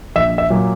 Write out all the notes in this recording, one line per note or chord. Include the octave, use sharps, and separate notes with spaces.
A#1 E5
E5
A#2 F#3